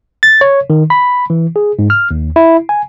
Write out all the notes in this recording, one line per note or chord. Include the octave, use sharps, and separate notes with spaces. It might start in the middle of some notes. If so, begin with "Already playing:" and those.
A6
C#5
D#3
B5
E3
G#4
G#2
F6
D#2
E4
G#5